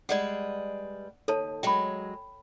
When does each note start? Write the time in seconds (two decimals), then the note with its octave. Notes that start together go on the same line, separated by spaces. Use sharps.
0.09 G3 G#3 B4 D5 F#5
1.28 D#2 A4 C#5 A5
1.63 F#3 G#3 G5 B5